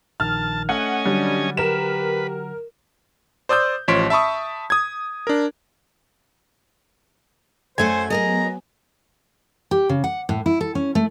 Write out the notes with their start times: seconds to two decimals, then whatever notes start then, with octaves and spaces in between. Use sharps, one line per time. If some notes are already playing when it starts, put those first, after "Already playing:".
0.20 A#1 D#3 A5 F6
0.69 A3 C#4 A4 D#5 F#5 G#5
1.05 D3 F#3 G3 D4 F#5
1.57 G4 A#4 B4 E7
3.49 C5 D5 D#6 E6 G6
3.88 A1 F3 C#5 C6 B6 D7
4.10 E5 A5 B5 C#6 D#6
4.70 D#6 G#6
5.27 D4 A#4
7.78 F#2 A3 F#4 C5 G#5
8.10 F#3 B3 G#4 A#4 D#5 A#5
9.71 G4
9.89 C#3
10.04 F#5
10.29 A2
10.46 E4
10.61 A4
10.75 C#4
10.95 A3